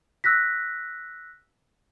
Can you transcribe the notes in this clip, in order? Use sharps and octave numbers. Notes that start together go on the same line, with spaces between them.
E6 F#6 A#6 B6